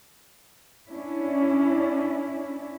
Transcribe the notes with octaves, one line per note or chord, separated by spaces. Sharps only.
C#4 D4 E4